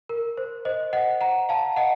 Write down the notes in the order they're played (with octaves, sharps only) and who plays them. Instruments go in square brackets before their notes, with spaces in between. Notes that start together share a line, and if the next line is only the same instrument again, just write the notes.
[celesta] A#4
C5
C5 D#5
D#5 F#5
F#5 A#5
F5 A5
D#5 F#5